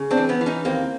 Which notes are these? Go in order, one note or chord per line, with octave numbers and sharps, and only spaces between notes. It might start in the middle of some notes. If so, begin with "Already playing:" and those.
Already playing: C#3
C4 D4
E3
B3 C#4
E3
C#4 D#4
D#2 A#3 C4